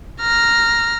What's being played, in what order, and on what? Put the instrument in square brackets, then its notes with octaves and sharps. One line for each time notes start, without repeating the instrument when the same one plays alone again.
[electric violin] A#5 F6